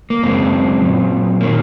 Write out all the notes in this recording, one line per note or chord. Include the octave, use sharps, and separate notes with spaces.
A#3
F#2 C#3 G#3 C4
A#2 F#3
D#3 F#3 A#3